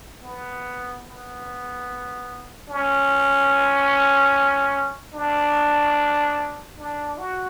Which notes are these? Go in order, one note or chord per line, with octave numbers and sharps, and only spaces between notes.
B3
B3
C#4
D4
D4
F#4